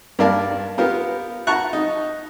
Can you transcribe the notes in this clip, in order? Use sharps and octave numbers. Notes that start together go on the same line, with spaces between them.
G2 A#3 A#4 D5 F5 A5
B3 F4 G4 A#4
F#5 A5 A#5 C#6 F#6
D#4